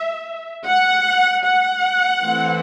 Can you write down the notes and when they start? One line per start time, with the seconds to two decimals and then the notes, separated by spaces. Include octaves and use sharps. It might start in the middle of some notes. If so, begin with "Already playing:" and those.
Already playing: E5
0.66 F#5
1.44 F#5
2.22 E3 A3 C4